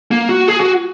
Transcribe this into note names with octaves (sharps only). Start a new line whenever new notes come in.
A#3
F#4
G#4
F#4